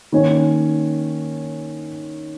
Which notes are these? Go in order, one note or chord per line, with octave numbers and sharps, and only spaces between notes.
D#3 A#3 C#4